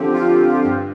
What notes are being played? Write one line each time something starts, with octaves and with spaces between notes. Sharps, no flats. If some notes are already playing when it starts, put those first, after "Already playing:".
Already playing: D3 F3 C4 G4
F4
G2